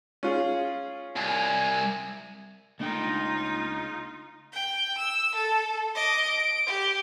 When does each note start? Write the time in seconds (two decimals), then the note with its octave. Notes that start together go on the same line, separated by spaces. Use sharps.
0.23 C#4 F4 G#4
1.16 C2 G#5
2.79 C#2 A3 A#3 D4 D#4 F4 G5
4.53 G5
4.98 E6
5.35 A4
5.95 D#5 D6
6.25 D7
6.67 G4